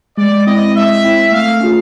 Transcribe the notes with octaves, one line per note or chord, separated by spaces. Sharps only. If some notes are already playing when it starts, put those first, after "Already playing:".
G#3 D5
C4 E4 D#5
G#3 E5
C4 E4
A3 F5
C#4 F4 G#4